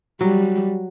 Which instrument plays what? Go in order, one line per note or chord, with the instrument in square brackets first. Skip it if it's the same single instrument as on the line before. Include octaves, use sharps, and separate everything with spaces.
[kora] F#3 [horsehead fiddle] G3